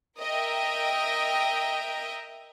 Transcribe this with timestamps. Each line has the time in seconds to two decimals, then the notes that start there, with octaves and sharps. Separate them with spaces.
0.19 A#4 D#5 E5 G5